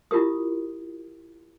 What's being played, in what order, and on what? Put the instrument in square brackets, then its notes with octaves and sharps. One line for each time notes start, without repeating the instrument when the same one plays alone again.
[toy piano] E4 F4 G4 A#4 D#6